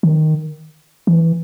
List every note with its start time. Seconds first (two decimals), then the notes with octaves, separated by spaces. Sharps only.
0.03 D#3
1.07 E3